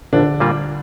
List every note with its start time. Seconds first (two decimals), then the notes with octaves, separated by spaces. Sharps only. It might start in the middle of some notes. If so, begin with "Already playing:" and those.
0.13 A#1 D3 D4
0.40 A#2 G3 A#3 F4